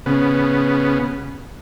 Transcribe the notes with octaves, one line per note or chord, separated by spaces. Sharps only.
C#3 B3